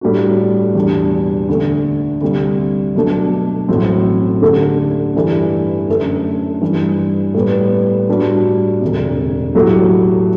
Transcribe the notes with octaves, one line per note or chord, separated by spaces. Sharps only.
A2 G3 D4 F#4
E2 B2 G3 D4
D2 D3 A3
D2 C3 G3
B2 F#3 A3 D4
A1 A2 F#3 C4
D2 D3 A3 D4 G4
G2 E3 A3 E4 G4
F#2 D3 A3
G2 E3 G3
A2 G3 B3
A2 G3 D4 F#4
E1 D2 C3
A2 F#3 A3 E4 G4